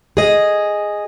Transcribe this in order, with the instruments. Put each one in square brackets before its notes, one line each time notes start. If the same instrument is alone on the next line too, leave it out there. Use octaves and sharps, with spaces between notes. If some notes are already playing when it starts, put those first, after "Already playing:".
[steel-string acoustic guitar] G#4 D#5